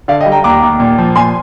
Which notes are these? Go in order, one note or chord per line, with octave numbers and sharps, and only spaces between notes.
D3 D5 F5
D#5 G5
G3
G5 A#5
D#2 A#5 D6
D#2
A#2
F3
A#2 G#5 C6